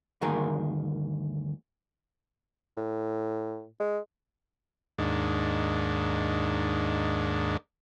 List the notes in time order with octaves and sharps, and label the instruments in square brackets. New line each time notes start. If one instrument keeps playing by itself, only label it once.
[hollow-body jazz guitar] D2 G2 D#3 A#3 G#4 A#4
[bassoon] A2
G#3
[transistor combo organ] D#2 G#2 D4